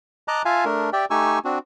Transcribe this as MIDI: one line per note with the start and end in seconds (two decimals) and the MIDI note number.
0.28 0.42 75
0.28 0.42 81
0.28 0.42 82
0.28 0.42 86
0.28 0.42 90
0.45 0.65 65
0.45 0.65 76
0.45 0.65 77
0.45 0.65 80
0.45 0.65 81
0.65 0.90 57
0.65 0.90 62
0.65 0.90 70
0.93 1.05 67
0.93 1.05 74
0.93 1.05 76
0.93 1.05 79
1.10 1.39 57
1.10 1.39 63
1.10 1.39 67
1.10 1.39 80
1.10 1.39 85
1.10 1.39 88
1.45 1.59 60
1.45 1.59 62
1.45 1.59 66